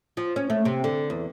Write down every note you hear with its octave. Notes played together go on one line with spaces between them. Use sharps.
F3
C#4
A3
C3
D3
E2